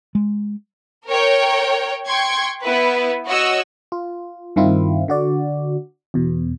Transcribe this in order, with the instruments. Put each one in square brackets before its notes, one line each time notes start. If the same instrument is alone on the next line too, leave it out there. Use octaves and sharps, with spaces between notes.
[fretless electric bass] G#3
[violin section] A#4 C#5 G5
G5 C6 C#6 G#6
B3 E4 B4
F#4 C#5 D#5 E6
[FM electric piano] F4
G2 D#3 C4 E4 F4
D3 F#4 D5
E2 B2